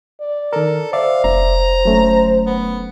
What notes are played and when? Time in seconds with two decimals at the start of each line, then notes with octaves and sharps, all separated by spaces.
0.21 D5
0.53 D#3 A4 A#4
0.93 C5 D5 E5 F5
1.24 F1 A#5
1.85 F#3 A3 C#4
2.46 B3